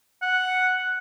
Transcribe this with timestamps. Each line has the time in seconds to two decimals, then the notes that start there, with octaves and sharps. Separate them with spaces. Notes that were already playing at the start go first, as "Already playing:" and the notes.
0.22 F#5